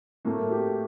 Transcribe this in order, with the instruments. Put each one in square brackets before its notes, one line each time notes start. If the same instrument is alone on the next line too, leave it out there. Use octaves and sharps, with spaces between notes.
[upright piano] A2 A3 A#3
G4